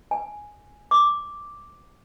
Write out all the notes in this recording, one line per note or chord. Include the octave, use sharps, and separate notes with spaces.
G#5
D6